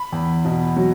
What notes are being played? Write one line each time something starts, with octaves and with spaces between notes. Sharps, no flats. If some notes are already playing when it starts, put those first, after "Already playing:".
Already playing: B5
E2
B2
F#3